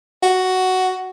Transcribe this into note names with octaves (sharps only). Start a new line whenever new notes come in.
F#4